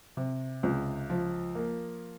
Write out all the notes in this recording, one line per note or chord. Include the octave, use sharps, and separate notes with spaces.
C3
C#2
F3
A#3